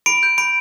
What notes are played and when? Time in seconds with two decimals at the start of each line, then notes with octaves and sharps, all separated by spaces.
0.06 B5 D7
0.23 G6
0.38 B5 D7